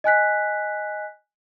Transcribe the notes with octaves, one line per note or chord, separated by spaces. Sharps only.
D#5 G#5 F#6 B6